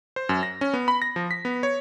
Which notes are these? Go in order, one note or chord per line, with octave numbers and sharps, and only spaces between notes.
C5
F#2
A#6
C#4
B3
B5
A#6
F3
B6
B3
C#5